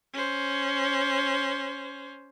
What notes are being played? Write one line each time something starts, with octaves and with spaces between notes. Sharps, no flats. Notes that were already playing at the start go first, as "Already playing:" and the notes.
C#4 C5